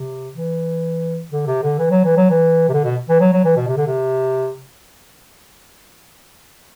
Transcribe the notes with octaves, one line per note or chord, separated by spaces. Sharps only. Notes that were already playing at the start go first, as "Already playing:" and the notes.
Already playing: C3
E3
D3
C3
D3
E3
F#3
E3
F#3
E3
C3
D3
B2
E3
F#3
F#3
E3
B2
C3
D3
C3